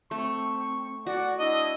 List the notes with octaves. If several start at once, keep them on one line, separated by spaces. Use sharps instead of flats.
A3 C4 C#6
F#4 D5 F#5
D4 E4 D#5